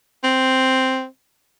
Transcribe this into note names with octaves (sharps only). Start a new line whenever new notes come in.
C4